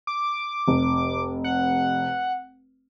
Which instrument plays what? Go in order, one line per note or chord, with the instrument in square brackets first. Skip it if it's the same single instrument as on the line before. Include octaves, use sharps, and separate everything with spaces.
[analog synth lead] D6
[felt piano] F1
[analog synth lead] F#5